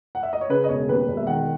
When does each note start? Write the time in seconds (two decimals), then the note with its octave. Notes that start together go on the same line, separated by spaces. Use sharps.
0.15 F#5
0.23 E5
0.33 D#5
0.41 C#5
0.49 C#3 B4
0.64 D#5
0.69 E1 C#5
0.89 D#2 B4
1.08 E1
1.17 E5
1.27 D#3 F#5